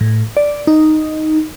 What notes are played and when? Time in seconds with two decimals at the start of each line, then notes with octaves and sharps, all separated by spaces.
0.01 A2
0.37 D5
0.67 D#4